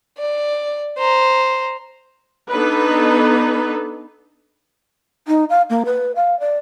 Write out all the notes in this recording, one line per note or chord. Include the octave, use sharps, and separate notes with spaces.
D5
C5 A#5
B3 D4 D#4 A4 B4
D#4
F5
A#3
B4
F5
D5